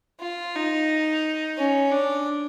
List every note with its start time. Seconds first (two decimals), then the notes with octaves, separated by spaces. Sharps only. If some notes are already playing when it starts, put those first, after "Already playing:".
0.20 F4
0.55 D#4
1.58 C#4
1.92 D4